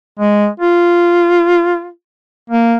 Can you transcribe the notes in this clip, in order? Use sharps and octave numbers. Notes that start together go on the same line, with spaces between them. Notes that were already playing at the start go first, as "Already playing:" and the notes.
G#3
F4
A#3